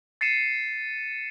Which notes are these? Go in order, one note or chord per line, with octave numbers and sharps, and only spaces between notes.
A6 C7 C#7 D#7 E7